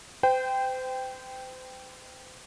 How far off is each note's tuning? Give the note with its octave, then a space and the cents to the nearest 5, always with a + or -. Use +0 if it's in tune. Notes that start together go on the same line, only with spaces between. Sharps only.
C5 -35 G5 +0